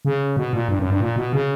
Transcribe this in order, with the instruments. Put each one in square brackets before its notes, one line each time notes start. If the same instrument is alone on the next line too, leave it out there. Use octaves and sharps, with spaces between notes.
[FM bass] C#3
B2
A#2
G2
F#2
G2
A#2
B2
C#3